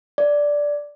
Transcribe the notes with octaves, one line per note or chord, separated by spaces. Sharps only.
D5